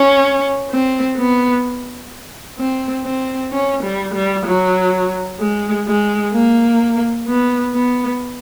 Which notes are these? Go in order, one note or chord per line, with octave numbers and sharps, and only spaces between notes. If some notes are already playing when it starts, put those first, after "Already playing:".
Already playing: C#4
C4
B3
C4
C4
C#4
G3
G3
F#3
G#3
G#3
A#3
B3
B3